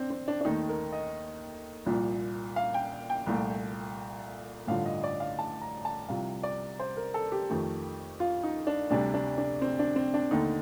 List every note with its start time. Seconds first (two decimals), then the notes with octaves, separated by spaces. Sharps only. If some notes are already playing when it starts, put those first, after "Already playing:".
Already playing: C4 D4
0.10 C4
0.28 D4
0.41 D4
0.45 D#2 D#3 A3 D#4
0.69 A#4
0.92 D#5
1.86 C2 A#2 F3
2.56 F5
2.74 G5
3.10 G5
3.27 C2 A#2 F3 A3
4.67 A1 G2 D3 F3 F5
4.86 D#5
5.04 D5
5.20 F5
5.39 A5
5.61 A#5
5.85 A5
6.09 C2 C3 F3 F5
6.43 D5
6.80 C5
6.97 A#4
7.14 A4
7.32 G4
7.50 F2 D#3 A3
8.20 F4
8.43 D#4
8.67 D4
8.90 D2 C3 G3 D4
9.14 D4
9.38 D4
9.62 C4
9.79 D4
9.96 C4
10.14 D4
10.31 D#2 D3 A3 D#4